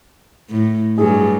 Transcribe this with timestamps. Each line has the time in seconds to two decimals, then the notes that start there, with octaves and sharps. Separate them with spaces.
0.50 A2
0.98 G2 F#3 G#4